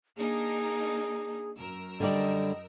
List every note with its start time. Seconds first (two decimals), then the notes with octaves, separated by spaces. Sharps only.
0.18 A#3 D4 D#4 G#4
1.57 F#2 A#4 E6
2.00 D3 G3 D5 D#5